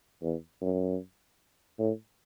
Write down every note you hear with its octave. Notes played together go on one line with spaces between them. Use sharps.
E2
F#2
A2